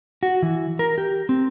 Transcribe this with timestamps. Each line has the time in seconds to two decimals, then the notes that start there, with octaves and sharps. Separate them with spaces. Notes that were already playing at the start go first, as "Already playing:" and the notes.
0.23 F#4
0.42 E3
0.79 A#4
0.98 G4
1.29 C4